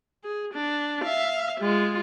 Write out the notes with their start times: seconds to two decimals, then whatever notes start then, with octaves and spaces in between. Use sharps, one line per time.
0.24 G#4
0.54 D4
1.03 E5 F5
1.60 G#3 F4